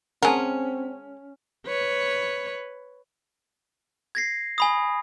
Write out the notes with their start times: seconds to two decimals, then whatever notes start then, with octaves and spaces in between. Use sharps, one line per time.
0.22 G#3 C4 C#4 A#4 F#5 G#5 A5
1.67 B4 C#5
4.15 G#6 A#6 C7
4.58 G#5 B5 D#6